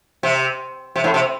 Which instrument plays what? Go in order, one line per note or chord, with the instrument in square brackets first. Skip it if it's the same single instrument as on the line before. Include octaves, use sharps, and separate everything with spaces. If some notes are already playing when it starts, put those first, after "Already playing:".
[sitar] C3
C3
A2
C3